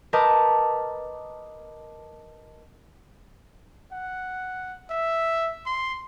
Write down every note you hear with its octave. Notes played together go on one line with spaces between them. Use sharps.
A#4 B4 D#5 A5 D6 G6
F#5
E5
C6